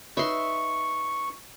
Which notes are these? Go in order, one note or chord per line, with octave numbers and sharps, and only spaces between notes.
D#4 B4 C#5 E5 C6 C#6